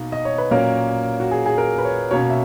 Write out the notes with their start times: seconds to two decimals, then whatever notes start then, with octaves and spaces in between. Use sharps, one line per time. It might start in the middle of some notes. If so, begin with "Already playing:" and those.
Already playing: B2 A#3 D#4
0.12 D#5
0.25 C#5
0.38 B4
0.51 A#2 F#3 A#3 C#4 A#4
1.20 F#4
1.31 G#4
1.46 G#4
1.58 A#4
1.78 B4
1.84 C#5
2.11 B2 A#3 C#4 C#5
2.30 E5